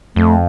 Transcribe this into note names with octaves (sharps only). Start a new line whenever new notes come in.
F2 A3